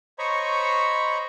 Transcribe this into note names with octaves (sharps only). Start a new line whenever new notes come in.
C5 C#5 D#5 A#5 B5 C#6